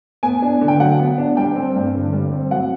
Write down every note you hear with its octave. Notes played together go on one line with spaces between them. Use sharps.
B3 G#5
D4
D3
G5
F#3 F#5
B3
D4
G3 G5
C4
G2
D3
G3
C4
F#3 F#5